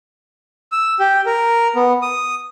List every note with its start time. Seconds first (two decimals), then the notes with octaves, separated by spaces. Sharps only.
0.72 E6
1.00 G4
1.26 A#4
1.76 B3
2.02 D#6